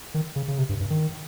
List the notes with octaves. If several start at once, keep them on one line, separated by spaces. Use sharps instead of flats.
D#3
C#3
C#3
C3
G2
G2
D#3